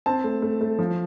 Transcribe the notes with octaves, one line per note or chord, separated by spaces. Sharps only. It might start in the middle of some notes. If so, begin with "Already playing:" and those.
C4 A5
A3
A3
A3
F3